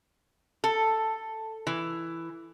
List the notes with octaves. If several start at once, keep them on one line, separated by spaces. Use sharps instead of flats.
A4
E3